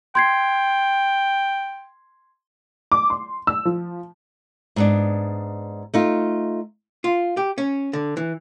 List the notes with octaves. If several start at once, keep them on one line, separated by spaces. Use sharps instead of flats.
G5 C6 G#6 C7
D6
C6
E6
F3
G#2 B3 D4
A3 D#4 F4
F4
G4
C#4
D3
E3